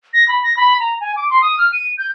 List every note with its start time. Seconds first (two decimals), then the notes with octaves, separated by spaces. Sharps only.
0.13 A#6
0.28 B5
0.43 A#6
0.57 B5
0.80 A#5
1.01 G#5
1.16 D6
1.30 C6
1.42 D#6
1.58 F6
1.73 D#7
1.98 G6